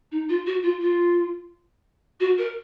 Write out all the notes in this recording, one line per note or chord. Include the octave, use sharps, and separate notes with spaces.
D#4
F4
F#4
F4
F4
F#4
A#4